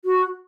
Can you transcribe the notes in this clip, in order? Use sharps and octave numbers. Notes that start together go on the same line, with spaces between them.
F#4